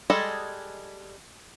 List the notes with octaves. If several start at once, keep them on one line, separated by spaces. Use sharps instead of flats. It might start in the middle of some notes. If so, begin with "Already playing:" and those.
G3 G#3 G#4 A4 D#5